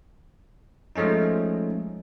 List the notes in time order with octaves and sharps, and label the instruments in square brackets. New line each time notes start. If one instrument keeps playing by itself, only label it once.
[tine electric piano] F3 G#3 A3 C#4 D#4